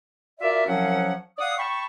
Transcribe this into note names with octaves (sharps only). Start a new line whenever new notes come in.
F4 F#4 A#4 D5 E5
C2 F3 F#3 C#4 F5 F#5
D5 F5 F#5 D#6
G5 A5 B5 C#6